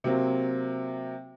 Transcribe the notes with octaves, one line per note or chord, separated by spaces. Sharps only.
C3 F#3 A#3 C4